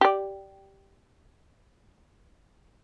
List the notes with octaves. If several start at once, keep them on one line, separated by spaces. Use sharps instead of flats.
G4 D5